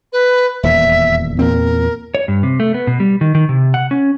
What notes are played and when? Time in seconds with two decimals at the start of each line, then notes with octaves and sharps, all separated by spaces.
0.13 B4
0.63 D#1 E2 B2 E5
1.39 E2 A#2 C4 A#4
2.15 C#5
2.28 G2
2.43 C3
2.60 A3
2.74 B3
2.87 B2
3.00 G3
3.21 D#3
3.35 D#3
3.49 C3
3.74 F#5
3.91 C#4